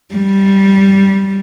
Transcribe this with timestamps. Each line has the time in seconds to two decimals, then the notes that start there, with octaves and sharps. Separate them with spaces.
0.14 G3